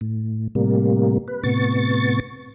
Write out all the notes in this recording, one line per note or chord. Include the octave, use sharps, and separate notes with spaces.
A2
A2 C3 G3 A#3
B4
A2 C3 B3 C#6 A6